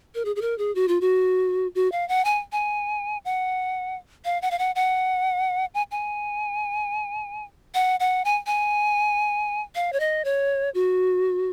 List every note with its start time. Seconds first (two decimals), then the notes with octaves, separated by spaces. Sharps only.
0.15 A#4
0.25 G#4
0.36 G#4
0.42 A#4
0.58 G#4
0.75 F#4
0.88 F4
1.01 F#4
1.75 F#4
1.92 F5
2.09 F#5
2.25 G#5
2.52 G#5
3.25 F#5
4.25 F5
4.42 F#5
4.51 F5
4.59 F#5
4.75 F#5
5.74 G#5
5.91 G#5
7.74 F#5
8.00 F#5
8.25 G#5
8.46 G#5
9.75 F5
9.93 C#5
10.00 D#5
10.25 C#5
10.74 F#4